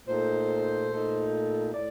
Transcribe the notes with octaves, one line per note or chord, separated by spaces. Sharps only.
A#2 A3 D#4 C5
A#2 A3 D#4
A2 D5